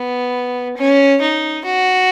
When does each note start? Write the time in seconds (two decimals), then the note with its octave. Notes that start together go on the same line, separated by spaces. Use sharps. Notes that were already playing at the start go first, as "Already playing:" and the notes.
Already playing: B3
0.77 C#4
1.21 D#4
1.65 F#4